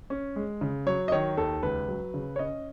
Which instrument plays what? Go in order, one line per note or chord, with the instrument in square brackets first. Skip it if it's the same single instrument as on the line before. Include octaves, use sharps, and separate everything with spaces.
[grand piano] C#4
G#3
C#3
F#3 C#5
D#5
D#3 C#5
D#2 A4
C#2 B4
F#3
C#3
C#5
C#4 D#5